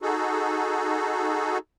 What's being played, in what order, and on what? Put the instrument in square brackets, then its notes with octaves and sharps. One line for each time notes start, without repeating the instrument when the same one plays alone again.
[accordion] D#4 F#4 G#4 A4